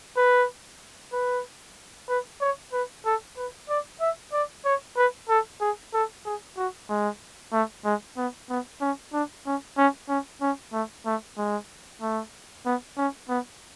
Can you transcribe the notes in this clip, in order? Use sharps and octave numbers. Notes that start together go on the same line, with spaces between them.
B4
B4
B4
C#5
B4
A4
B4
D5
E5
D5
C#5
B4
A4
G#4
A4
G#4
F#4
G#3
A3
G#3
B3
B3
C#4
D4
C#4
C#4
C#4
C#4
A3
A3
G#3
A3
B3
C#4
B3